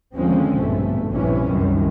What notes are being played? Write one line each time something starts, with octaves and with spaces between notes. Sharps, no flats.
D#2 D3 F3 G#3 C4 C#4
A#1 G2 B2 A3
F1 A#1 G2 C3 E3 C#4
C2 F#2 D#3